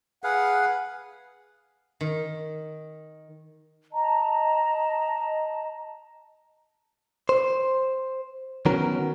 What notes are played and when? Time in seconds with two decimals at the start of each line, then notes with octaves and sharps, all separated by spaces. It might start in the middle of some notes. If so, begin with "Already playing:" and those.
0.24 G#4 B4 F5 F#5
2.01 D#3
3.92 D#5 A5 A#5
7.29 C5
8.66 D#3 F#3 B3 C#4 A#4